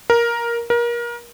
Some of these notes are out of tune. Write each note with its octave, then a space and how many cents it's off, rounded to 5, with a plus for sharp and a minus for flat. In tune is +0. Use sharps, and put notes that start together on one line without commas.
A#4 +10
A#4 +30